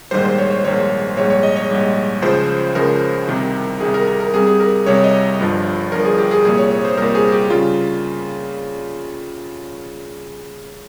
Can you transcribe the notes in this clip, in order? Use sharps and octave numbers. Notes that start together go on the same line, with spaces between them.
A#1 G#2 D#3 G3 C5
C5
C#5
C#5
A#1 G#2 D#3 G3 C#5
A#1 G#2 G3 C#5
C#5
D#5
C#5
A#1 G#2 G3
C#2 C#3 F3 C5
C#2 C#3 F3 A#4
C2 C3 D#3
C2 C3 D#3 G#4
A#4
A#4
A#4
C2 C3 G3 G#4
G#4
A#4
C2 C3 G3 C#5
D#5
G1 G2 F3
G1 G2 F3 A#4
G#4
G4
G#4
C2 A#2 G3 G#4
C#5
C#5
C5
C2 A#2 G3 A#4
G#4
G4
C#3 G3 F4